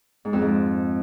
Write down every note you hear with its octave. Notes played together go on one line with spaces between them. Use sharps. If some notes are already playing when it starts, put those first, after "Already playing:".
G#2
F2
G#2